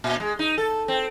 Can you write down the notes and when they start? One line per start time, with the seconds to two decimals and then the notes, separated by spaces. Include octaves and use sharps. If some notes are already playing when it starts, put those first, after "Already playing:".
0.04 A#2
0.20 G#3
0.39 D#4
0.58 A4
0.88 C4